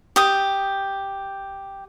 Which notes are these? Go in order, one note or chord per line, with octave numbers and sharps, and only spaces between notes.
G4 D#6